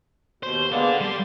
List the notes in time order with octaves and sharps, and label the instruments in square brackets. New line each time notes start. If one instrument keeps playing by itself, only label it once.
[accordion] D#2 B2 [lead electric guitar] C5
[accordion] G#3 A#3 B3 [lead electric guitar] A4 D5
[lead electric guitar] G3 [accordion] C6